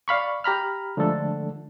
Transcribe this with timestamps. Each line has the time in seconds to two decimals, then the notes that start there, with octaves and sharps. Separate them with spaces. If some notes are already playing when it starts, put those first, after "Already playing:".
0.08 D5 F5 B5 C#6
0.44 G4 A#5 B5 F6
0.97 D3 F3 G#3 A3 D4 A4